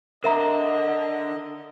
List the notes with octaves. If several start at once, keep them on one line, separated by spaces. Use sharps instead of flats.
D3 A#4 D#5 E5 A#5